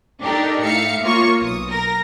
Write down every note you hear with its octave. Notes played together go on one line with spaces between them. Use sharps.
D4 D#4 G4 A4 A#4
A2 E5 F5 C#7
A#3 F4 C#5 C#6
B1 D#6
A#4 A#6